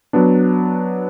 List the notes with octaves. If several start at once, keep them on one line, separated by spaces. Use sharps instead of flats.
F#3 B3 D4